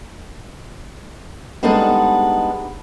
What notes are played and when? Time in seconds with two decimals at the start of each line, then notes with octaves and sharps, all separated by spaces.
1.63 G3 G#3 B3 D4 D#4 A4